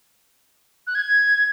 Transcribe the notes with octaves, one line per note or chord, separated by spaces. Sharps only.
F#6
G#6